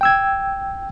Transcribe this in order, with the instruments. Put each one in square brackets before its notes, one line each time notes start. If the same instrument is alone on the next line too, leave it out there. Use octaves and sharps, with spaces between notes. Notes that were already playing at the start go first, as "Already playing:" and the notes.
[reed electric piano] G5 E6 G#6